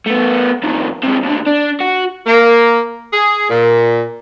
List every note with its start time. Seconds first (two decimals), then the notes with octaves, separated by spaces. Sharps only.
0.06 A3 B3
0.64 F2 D#3
1.03 C3 G#3
1.23 D#2 D3
1.47 D4
1.80 F#4
2.27 A#3
3.13 G#4
3.50 A#2